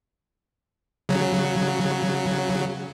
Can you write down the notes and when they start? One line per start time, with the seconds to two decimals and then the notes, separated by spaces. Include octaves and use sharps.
1.09 C#3 F#3